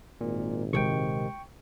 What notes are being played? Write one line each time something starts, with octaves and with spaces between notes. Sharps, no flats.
G#1 A#2
A#1 C3 D#3 G#3 G5 C#6